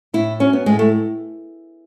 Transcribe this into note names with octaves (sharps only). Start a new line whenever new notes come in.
A2 E4
F#3 C#4
B3
A2 G#3
A3